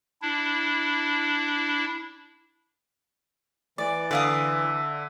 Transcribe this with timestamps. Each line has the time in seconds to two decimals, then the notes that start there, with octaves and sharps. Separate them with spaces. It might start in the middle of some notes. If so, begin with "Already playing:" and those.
0.22 D4 E4
3.78 E3 D5
4.11 D3 D5 E5 F5 D#6